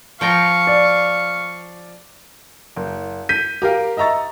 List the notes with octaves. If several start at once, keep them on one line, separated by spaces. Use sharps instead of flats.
F3 F5 G5 A#5 C#6
D5
F#1
G6 B6 D#7
G4 A#4 F5
D#5 E5 A#5 C#6 A6